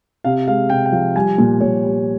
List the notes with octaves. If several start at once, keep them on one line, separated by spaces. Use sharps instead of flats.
C3 F5
G#3 F5
C3 G5
G5
F3 F5
G3 G#5
A#2
A#2 C#5
G3